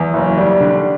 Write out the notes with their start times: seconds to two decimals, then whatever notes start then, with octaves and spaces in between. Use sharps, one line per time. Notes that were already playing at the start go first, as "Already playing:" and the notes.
Already playing: E2
0.14 F#1
0.37 G3
0.60 D3